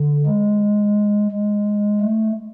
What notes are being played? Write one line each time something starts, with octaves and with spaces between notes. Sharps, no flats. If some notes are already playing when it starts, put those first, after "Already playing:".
Already playing: D3
G#3
G#3
A3